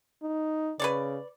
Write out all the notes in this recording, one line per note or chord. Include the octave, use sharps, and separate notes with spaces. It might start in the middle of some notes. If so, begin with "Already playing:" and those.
D#4
C#3 B4 C#5 D5